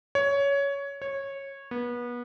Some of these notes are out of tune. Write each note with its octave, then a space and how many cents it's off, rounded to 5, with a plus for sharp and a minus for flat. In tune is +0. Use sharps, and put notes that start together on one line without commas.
C#5 +15
C#5 -15
B3 -30